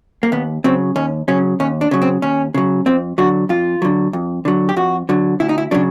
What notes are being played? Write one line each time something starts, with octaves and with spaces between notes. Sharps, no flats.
A#3
D#2 B3
C#3 F#3 C4
D#2 C#4
C#3 F#3 C#4
D#2 C#4
D4
C#3 F#3
C4
D#2 C#4
C#3 F#3
F2 C4
D3 F#3 F#4
F2 F4
D3 F#3
F2
D3 F#3
G4
F2 F#4
D3 F#3
D2 E4
D#4
E4
C#3 F#3 D4